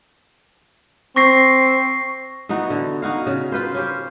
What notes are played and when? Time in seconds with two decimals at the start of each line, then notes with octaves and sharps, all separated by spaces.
1.16 C4 C#6 A#6 C7
2.49 E3 B3 D#4 F#4
2.70 D3
3.02 D#4 F#4 F5
3.26 C#3
3.52 F4 B4 C5
3.75 C#4 G4 C5